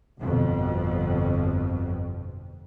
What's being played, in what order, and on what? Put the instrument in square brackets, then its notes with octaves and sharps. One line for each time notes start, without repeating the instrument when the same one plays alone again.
[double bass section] G1 F2 B2